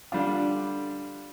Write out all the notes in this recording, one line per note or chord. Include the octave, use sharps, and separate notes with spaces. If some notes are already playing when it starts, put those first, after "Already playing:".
D3 G3 D4 F4